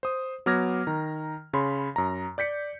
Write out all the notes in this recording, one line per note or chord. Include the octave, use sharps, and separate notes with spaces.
C5 D#6
F#3 B3 D6 F6 G#6 A#6
D#3 A#5
C#3 C#5 B5 C6
F#2 A#5
D5 G6 B6 C#7